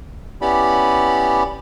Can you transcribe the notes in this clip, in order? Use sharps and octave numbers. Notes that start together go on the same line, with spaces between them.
B3 C#4 E4 G4 D5 B5